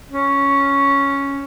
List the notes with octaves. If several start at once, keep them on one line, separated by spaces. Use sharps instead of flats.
C#4